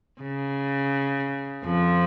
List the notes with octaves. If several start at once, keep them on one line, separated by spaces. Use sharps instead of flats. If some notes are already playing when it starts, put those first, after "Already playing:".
C#3
F2 F3